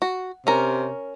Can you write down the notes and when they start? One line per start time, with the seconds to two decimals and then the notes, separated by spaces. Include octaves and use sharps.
0.02 F#4
0.47 C3 C#4 A#4